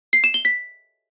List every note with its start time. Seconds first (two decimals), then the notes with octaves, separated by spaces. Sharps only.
0.13 C7
0.24 E7
0.34 G7
0.45 B6